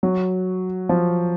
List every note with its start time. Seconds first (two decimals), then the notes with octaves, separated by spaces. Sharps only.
0.03 F#3
0.89 F3